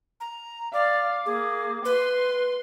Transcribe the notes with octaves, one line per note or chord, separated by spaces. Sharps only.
A#5
D5 F5 D6
A#3 G#4
B4 C6